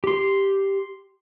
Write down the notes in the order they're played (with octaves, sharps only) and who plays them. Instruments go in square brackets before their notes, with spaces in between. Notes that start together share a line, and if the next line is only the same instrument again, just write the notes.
[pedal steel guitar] G4 C6